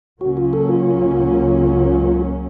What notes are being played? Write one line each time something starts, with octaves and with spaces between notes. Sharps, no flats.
C#2 C#3 F#3 A#3 C#4 F#4
F4
A4
F4